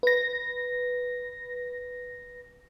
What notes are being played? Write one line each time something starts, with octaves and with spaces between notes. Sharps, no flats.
B4 A#6